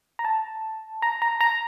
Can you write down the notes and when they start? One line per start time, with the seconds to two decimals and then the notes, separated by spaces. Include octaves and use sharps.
0.19 A#5
0.25 A5
1.02 A#5
1.22 A#5
1.41 A#5